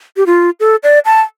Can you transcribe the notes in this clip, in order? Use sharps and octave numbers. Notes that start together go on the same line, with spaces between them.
G4
F4
A4
D5
A5